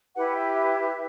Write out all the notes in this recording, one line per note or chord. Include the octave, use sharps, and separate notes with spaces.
E4 G4 B4 F#5
E5
E5